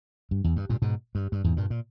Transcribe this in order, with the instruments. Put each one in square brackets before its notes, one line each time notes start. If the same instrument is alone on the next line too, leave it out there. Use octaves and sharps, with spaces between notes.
[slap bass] G2
E2
G2
G2 A#2
G#2 B2
G2
G2
E2 G#2
G2 A#2
A#2